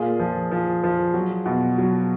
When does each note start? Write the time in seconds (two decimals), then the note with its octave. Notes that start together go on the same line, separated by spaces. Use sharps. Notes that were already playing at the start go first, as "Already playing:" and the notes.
Already playing: A#2 F4 G#4
0.20 F3
0.51 F3
0.83 F3
1.14 F#3
1.46 B2
1.78 F#3